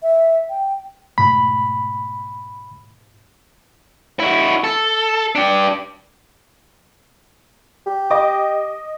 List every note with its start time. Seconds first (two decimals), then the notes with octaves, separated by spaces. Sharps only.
0.03 E5
0.50 G5
1.18 G#2 B2 A3 B5
4.20 E4 F#4
4.64 A4
5.35 D4 G4
7.86 G4
8.10 D#5 D6